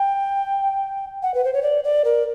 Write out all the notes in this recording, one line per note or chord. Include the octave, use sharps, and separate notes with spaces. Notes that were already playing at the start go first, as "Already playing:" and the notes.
Already playing: G5
F#5
B4
C5
C#5
D5
D5
A#4